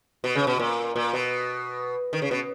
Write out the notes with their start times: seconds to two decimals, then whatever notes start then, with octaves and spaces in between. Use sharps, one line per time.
0.24 B2
0.35 C#3
0.47 B2
0.59 A#2
0.96 A#2
1.13 B2
2.13 D#3
2.22 C#3
2.31 B2